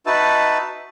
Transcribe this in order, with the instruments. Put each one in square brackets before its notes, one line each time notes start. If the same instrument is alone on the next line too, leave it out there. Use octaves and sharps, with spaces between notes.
[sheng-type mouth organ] D#4 F#4 B4 E5 A5